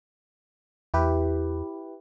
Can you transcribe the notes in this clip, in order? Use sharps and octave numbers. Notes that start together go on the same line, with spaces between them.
E2 E4 G4 B4